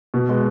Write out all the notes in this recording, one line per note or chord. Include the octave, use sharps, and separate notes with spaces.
B2
G#3 B3